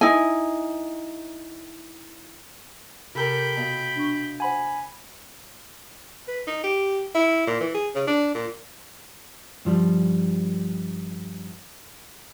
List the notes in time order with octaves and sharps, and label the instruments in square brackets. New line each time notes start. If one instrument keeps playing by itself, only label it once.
[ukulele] D#4 E4 G#5
[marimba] C3 E6 [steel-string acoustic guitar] G4 A4 A#4 [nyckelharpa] G5 B5
[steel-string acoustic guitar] B2 F4
[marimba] D4 C#6
[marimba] C5 F#5 [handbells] G#5 B5
[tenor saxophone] B4
D#4
G4
E4
A#2
E3
G#4
C#3
D4
A#2
[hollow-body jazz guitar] G2 F3 G3